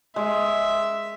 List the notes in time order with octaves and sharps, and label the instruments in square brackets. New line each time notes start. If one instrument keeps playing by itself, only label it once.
[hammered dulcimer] G#3 [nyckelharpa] E5